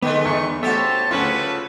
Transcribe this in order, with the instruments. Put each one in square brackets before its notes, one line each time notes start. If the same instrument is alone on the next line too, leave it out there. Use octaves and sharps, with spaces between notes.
[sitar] D3 G#3 A3 [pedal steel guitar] B3
[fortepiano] E2 [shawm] C#6
[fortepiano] A3 F#4 [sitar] C#4 G4 [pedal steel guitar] C5 C#5 E5 [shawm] A5
[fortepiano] D2 C#4 C6 [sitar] C#3 [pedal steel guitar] F4 A4 F#5 [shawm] B4